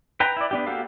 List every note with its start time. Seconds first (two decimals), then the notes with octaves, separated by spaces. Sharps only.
0.20 B4 G5 A#5
0.37 E4 D5
0.51 B3 D4 G4
0.66 A#3 F#4 G4 A4 F5